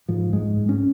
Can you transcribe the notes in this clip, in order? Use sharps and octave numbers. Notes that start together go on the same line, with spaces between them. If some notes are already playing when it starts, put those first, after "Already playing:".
G#2 F3
G#2 G#3
G#2
C#4